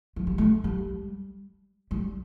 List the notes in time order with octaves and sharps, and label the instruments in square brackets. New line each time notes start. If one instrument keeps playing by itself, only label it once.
[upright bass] F3
G3
A3
G3
G3